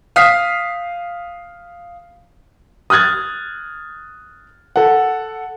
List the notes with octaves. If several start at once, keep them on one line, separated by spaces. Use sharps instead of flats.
F5 D#6 F6 B6 C7
D#6 F6 F#6 G#6 A6
A4 F#5